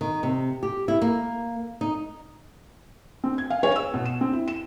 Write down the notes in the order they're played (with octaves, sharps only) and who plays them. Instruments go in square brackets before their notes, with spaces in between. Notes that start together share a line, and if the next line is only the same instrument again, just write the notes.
[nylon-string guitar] D#3
C3
G4
E4
A#3
D#4
[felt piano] C4
G#6
F5
C#5
E6
B2
E7
C4
E4
E7